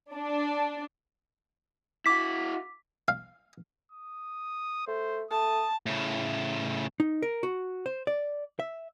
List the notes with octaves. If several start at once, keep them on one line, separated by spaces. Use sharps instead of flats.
D4
E4 F#4 D6 B6
F5
D#6
A3 C5
A3 A5 D#6
A2 C#3
D#4
A#4
F#4
C5
D5
E5